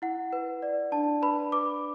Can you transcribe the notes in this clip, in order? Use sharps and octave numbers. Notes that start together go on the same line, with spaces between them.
E4 F#5
B4
D5
D4 A5
B4 B5
B4 D6